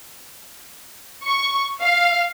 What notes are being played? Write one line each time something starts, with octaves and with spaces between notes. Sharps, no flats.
C#6
F5